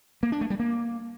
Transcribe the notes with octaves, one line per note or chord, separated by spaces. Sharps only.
A#3
D4
A3
G3
A#3